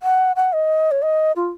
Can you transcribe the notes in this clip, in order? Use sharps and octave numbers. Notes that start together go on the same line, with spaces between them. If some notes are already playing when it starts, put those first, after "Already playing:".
F#5
F#5
D#5
C#5
D#5
F4